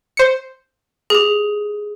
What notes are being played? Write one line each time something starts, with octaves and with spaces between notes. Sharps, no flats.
C5 C#7
G4 G#4